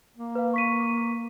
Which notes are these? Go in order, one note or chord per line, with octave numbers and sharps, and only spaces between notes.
A#3
B4 F5
C#6 B6 D#7